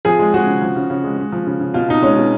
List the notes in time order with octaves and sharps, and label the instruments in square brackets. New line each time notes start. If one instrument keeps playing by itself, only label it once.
[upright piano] F3 G#4
G#3
G#3 F#4
C#3
F3
C#3
C#3
G#3
G#3
F3
C#3
C#3
B2 F4
B2 D#4
G#3 C#4
B2